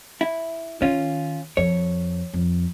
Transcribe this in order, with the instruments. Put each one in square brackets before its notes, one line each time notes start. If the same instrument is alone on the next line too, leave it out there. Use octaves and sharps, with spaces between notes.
[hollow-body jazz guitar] E4
[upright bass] D#3 [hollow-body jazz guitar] C#4 F4
[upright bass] F2 [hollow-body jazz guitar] C#5
[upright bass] F2